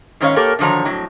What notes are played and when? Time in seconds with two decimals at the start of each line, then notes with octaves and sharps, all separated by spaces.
0.20 G#2 D#3 C#4 C#5 F5
0.36 A#3 G4 A4 A#4 C#5
0.59 D3 D#3 F3 F#3 A#5
0.85 F2 A2 F#3